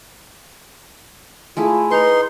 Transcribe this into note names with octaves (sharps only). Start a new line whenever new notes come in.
G#3 A3 E4 F4
D#4 B4 A#5 C6 C#6